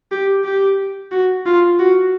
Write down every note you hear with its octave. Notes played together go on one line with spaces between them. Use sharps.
G4
G4
F#4
F4
F#4